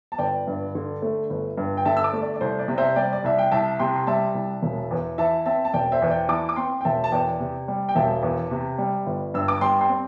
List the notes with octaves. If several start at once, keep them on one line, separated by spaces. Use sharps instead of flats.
A5
G1 D5 G5
G2
D3
A3
G1
G2
G5
D3 E5 A5
E6
A5 D6
A3
D5
D5
C2 C5
D5
C3
C5 E5
G3 D5 G5
D5
C2 E5
G5
C2 E5 A5
C3 G5 C6
C6
G3 E5 A5
C2
E1
E2
E3 E5 A5
C4 E5 A5
A5
E1 D5 G5
C5 E5
E2
D5 G5
E3 A5 D6
D6
C4 G5 C6
G5
E1 E5 A5
A5
E2 D5 G5
C3
G3
G5
E1 E5 A5
E2
C3
G3
G1
G2 E6
D6
G3 G5 C6
G5 C6
C4